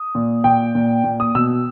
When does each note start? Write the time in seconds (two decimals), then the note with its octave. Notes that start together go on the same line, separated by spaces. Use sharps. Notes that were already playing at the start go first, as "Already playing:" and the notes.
Already playing: D#6
0.15 A#2
0.44 A#2 G5
0.75 A#2
1.04 A#2
1.20 D#6
1.35 B2 E6